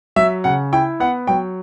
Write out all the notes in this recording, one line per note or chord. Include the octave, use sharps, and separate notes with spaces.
F#3 E5
C#3 F#5
E4 G5
B3 F#5
F#3 G5